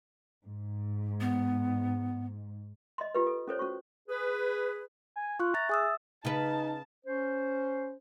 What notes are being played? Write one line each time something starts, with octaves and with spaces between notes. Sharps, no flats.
G#2
B3
D#5 C6
F4 G4 B4
A4
C#4 A4 C5 C#5
C#4 F#4 C#6
G#4 B4
G#5
F4 C#6 F#6
E5 A#5 A6
G#4 E5 D#6 E6
C#3 D#4 B4 A5
C#4 C5